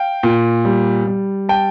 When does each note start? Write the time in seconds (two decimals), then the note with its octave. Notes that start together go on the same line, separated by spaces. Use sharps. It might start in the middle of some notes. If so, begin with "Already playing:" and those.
Already playing: F5 G5
0.23 A#2
0.65 G3
1.07 G3
1.49 G5 A5